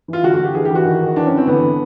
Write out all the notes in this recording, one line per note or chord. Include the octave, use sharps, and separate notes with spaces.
E3
F4
D3 F#4
F#4
D3 G4
E3 G#4
G4
E3 F#4
D#3
D#3
E3 D4
C#4
E3
C4
D3 B3
D3